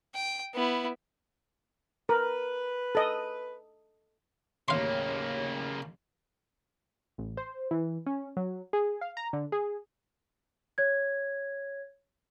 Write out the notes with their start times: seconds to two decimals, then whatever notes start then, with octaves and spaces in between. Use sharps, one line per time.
0.15 G5
0.54 B3 E4
2.09 A#4 B4
2.95 A4 D#5
4.68 A1 D#2 C#3 A#3 C#5 F5 C6
7.18 A1
7.37 C5
7.71 E3
8.06 C#4
8.37 F#3
8.73 G#4
9.01 F5
9.17 A#5
9.33 D3
9.52 G#4
10.78 C#5 G#6